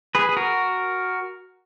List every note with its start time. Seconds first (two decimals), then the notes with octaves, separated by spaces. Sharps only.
0.15 G#4 B4
0.29 G#4
0.37 F#4 A#4